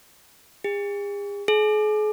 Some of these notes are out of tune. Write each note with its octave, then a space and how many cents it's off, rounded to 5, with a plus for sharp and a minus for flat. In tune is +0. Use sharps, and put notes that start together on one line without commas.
G#4 -45
G#4 +40